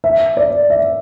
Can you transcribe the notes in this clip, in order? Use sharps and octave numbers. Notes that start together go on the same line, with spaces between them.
E5
D5
E5